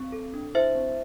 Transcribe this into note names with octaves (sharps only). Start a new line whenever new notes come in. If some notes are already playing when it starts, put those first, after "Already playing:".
Already playing: C4
A4
D4
E4 C5 E5
C4